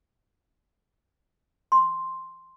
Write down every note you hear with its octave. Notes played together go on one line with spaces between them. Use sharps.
C6